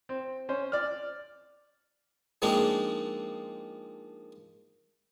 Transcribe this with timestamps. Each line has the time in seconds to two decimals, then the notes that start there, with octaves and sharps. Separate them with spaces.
0.09 C4
0.49 C#4 C5
0.72 D5 F6
2.42 F3 G#3 A#3 C4 D4 D#4